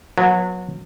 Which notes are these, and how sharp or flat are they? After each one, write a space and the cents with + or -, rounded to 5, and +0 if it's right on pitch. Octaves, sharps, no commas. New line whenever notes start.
F#3 -25 B3 -30